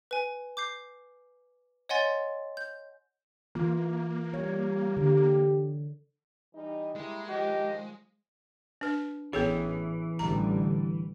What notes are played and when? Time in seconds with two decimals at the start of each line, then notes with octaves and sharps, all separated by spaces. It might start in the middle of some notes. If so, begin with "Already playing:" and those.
0.11 B4 G#5
0.57 D6 G6 C7
1.89 C#5 D#5 F#5 G#5 C6 A6
2.57 G6
3.55 E3 A#3 F4
4.34 G3 C#5
4.97 D3 G4
6.54 E3 G3 D#4
6.96 G3 G#3 A#3 E4
7.28 A2 D#3 F3 G4 D#5
8.81 D4 B4
9.33 A1 E3 B3 G#4 A4 C#5
10.19 A1 D3 G3 A#5